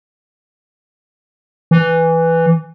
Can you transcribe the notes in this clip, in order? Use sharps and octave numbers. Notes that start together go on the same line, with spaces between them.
E3